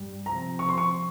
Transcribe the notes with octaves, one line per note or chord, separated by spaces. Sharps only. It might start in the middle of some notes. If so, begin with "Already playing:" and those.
Already playing: G2 G3
C3 F3 C4 A#5
C#6
C6
C#6